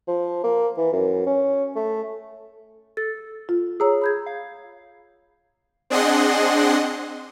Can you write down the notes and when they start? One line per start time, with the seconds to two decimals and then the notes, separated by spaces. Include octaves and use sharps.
0.08 F3
0.44 A#3
0.78 E3
0.92 F#2
1.26 C#4
1.75 A3
2.97 A4 A6
3.49 F4
3.80 G#4 C#5 A#5 E6
4.02 B5 G6 G#6
4.26 F5
5.90 C4 D4 G#4 D#5 F#5 C6